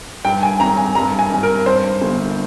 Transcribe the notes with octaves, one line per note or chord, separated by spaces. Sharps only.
G2 G5
G#5
G#1 A#5
G#5
G2 A#5
G#5
G#1
A#4
G2 C5
G1